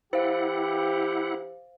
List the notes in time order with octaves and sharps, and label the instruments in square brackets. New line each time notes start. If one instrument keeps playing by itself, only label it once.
[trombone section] E3 G4 [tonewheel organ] E4 F#5 [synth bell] C5 F5